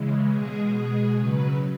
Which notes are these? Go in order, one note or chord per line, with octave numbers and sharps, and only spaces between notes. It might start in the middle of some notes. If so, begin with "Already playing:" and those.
Already playing: C#3 E3 G#3
B2 G#3 G#4
B2 G#3 G#4
C#3 F#3 B4